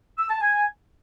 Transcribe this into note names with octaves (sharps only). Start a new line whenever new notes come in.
E6
A5
G#5